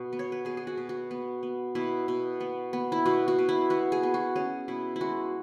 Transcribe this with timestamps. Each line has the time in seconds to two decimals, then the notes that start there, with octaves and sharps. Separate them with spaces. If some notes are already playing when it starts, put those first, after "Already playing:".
Already playing: B2
0.13 B3
0.19 C#5
0.32 B4
0.45 B2 G#4
0.57 G#4
0.67 F#4
0.77 B2
0.89 F#4
1.11 B3
1.43 B3
1.75 B2 E4
2.08 B2
2.40 B3
2.73 B3
2.92 E4
3.06 B2 F#4
3.28 F#4
3.39 B2
3.49 E4
3.70 B3 F#4
3.92 G#4
4.03 B3
4.14 F#4
4.36 C#4 G#4
4.68 B2 E4
4.96 E4
5.01 G#3 F#4